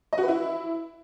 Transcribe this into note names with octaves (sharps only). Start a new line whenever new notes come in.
D#5
F#4
B4
E4